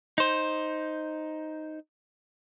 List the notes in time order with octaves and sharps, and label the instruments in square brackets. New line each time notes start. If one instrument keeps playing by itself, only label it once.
[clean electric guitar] D#4 C5